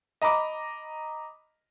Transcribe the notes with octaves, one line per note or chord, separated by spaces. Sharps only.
D#5 A#5 B5 D6